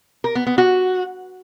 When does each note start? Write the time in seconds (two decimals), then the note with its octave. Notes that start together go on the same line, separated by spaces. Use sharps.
0.24 A#4
0.35 B3
0.47 B3
0.58 F#4